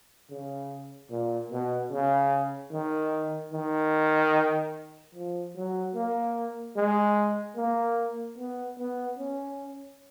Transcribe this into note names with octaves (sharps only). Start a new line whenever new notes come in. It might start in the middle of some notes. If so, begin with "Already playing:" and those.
C#3
A#2
B2
C#3
D#3
D#3
F3
F#3
A#3
G#3
A#3
B3
B3
C#4